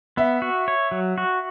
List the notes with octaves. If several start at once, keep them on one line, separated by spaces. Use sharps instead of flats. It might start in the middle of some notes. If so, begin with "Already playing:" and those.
B3 E5
F#4
C#5
F#3
F#4